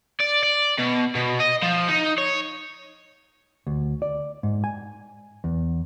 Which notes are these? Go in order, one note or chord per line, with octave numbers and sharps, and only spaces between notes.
D5
D5
B2
B2
D#5
F3
D#4
C#5
D2
D5
G#2
G#5
E2